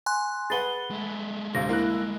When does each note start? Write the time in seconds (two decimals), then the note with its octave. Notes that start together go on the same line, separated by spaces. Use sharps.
0.06 G#5 C6 F#6
0.50 G#4 B4 F#5 A6 G7
0.91 G#3 A3
1.55 D2 C3 F5 A#6
1.69 A#3 E4 F#6